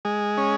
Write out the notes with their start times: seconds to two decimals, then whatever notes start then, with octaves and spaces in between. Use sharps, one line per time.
0.05 G#3
0.37 C#4